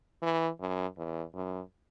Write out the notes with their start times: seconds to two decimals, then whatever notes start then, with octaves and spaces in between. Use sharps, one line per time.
0.22 E3
0.60 F#2
0.97 E2
1.34 F#2